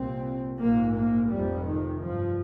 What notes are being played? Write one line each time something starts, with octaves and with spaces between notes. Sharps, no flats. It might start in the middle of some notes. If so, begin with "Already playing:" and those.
Already playing: C2 A#2 C4
A#1 G#2 A#3
A#3
F1 F2 C3 G3
D#3
G#1 G2 F3